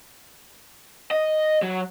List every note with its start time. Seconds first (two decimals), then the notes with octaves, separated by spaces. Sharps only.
1.11 D#5
1.63 F#3